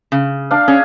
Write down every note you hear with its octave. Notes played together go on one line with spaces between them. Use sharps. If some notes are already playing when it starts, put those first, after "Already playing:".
C#3
D4 F5
C#4 G#4